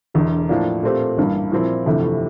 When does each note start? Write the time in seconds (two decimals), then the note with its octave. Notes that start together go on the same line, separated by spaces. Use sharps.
0.14 E1 E2 D3
0.49 A2 F3 A#3 D4
0.83 A#2 A3 C4 G4
1.17 A1 G2 E3 A#3
1.52 A#2 F3 C4 E4
1.86 G1 F2 C3 E3 A3